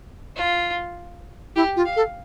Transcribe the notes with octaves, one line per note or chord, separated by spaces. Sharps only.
F4
E4 G4
F4
F5
A4